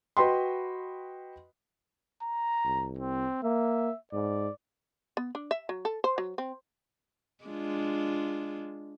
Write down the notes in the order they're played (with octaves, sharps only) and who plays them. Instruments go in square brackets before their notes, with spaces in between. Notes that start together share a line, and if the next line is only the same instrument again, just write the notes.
[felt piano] F#4 B4 D#5 G5 B5 C6
[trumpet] A#5
[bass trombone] C2
[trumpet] C4
[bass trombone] A#3 [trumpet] E5
[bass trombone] G#2 [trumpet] D5
[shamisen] B3
D4
E5
F#3
A4
C5
F#3
C4
[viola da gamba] G#3 D4 F4